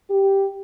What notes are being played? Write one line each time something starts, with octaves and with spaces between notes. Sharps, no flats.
G4